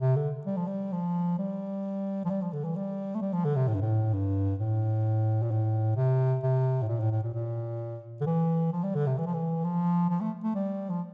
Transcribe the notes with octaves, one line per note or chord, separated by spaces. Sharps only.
C3
D3
G3
F3
G3
F3
G3
F3
G3
F3
D3
E3
G3
A3
G3
F3
D3
C3
A2
G2
A2
G2
A2
A#2
A2
C3
C3
A2
A#2
A2
A2
A#2
A#2
D3
E3
F3
G3
D3
C3
E3
F3
E3
F3
F3
A3
A3
G3
F3